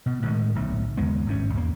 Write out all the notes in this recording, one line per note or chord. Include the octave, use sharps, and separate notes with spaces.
B2
A2 D#3 G3 G#3
D1 B1 A3
F#1 D#2 G#3 B3
G#1 G2 C#4
E2 A#3